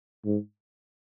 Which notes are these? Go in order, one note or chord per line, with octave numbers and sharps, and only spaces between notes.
G#2